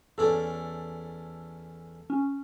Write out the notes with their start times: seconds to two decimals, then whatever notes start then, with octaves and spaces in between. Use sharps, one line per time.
0.18 E2 C#4 A4 D5
2.10 C#4